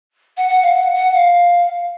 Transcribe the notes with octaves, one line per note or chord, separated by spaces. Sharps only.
F#5
F#5
F5
F#5
F#5
F5